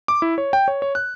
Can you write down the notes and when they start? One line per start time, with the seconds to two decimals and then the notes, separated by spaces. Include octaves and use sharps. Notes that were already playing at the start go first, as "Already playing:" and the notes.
0.08 D6
0.22 E4
0.38 C#5
0.53 G5
0.68 C#5
0.82 C#5
0.95 F#6